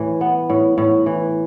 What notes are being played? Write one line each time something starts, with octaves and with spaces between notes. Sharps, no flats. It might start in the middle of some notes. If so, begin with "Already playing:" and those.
Already playing: A2 E3
B3
A2
A2
E3